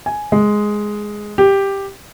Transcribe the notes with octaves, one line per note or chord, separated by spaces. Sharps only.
G#5
G#3
G4